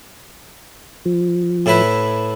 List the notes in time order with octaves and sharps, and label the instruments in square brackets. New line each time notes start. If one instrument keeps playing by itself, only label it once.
[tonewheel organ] F3
[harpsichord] A2 E4 B4